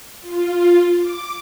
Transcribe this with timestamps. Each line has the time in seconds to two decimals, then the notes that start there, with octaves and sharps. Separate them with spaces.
0.21 F4
0.97 D6